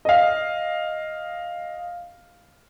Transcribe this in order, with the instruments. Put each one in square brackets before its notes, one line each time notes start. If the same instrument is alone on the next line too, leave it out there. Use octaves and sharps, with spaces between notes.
[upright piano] D#5 F5